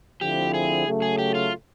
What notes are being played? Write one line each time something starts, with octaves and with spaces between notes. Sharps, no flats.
D3 F3 A3 C4 E4 G4
G#4
C#3 F#3 A3
G#4
G4
F4